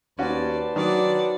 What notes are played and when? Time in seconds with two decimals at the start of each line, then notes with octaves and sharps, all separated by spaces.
0.19 D#2 C#4 F#4 B4 C5 D5 A5
0.76 D#3 F#3 D4 D5 F#5